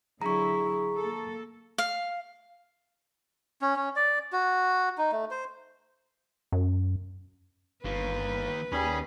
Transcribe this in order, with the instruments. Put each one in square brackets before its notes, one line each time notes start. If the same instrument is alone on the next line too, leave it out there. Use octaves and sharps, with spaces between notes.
[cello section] D3 F#3 E4 [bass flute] G#4 [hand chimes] A#5 C#6
[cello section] A#3 A4
[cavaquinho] F5
[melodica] C#4
C#4
D5
F#4
D#4
A3
C5
[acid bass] F#2
[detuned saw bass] G1 [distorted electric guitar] D#3 A#3 [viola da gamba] B4
[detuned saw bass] D#2 [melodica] G3 G#4 B5 [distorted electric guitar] C#4